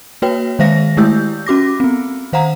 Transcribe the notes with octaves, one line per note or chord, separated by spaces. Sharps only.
A#3 F#4 B4 C#5 G5
D#3 G#3 C5 E5 F5 A#6
G#3 A3 E4 G4 E6 G6
C#4 F#4 D6 A#6
B3 C4
D#3 C5 F5 F#5 A#5